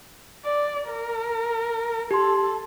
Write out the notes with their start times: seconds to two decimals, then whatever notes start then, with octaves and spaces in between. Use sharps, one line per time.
0.45 D5
0.89 A#4
2.11 G4 A4 C6